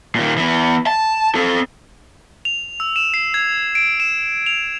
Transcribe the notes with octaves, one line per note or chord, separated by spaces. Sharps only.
A#2 D#3
E3 B3
A5
C4 A4
F7
E6
E7
C7
G#6
D7
E7
F7